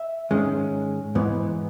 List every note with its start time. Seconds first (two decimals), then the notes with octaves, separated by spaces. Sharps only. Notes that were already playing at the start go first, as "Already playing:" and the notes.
Already playing: E5
0.31 G#2 D#3 G#3 C#4
1.15 G#2 E3 B3